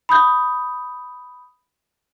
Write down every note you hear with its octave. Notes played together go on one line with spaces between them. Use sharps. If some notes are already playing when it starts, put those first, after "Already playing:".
B5 D#6 G6